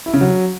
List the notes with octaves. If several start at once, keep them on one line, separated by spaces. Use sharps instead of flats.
E4
C#3
F#3